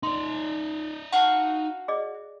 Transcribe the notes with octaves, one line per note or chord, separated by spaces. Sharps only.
D#4 D5 C6
F#4 F5 F#5 A5 C#6
G#4 D5 D#5